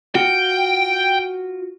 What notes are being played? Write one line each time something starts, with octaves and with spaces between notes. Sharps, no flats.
F4 F#4 G5